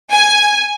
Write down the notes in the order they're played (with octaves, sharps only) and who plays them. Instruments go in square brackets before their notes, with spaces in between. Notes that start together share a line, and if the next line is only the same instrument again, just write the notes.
[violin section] G#5